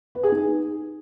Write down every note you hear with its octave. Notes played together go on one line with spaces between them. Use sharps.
B4
G#4
D#4